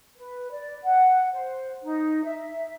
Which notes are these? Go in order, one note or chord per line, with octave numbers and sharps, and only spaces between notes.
B4
D5
F#5
C5
D#4
E5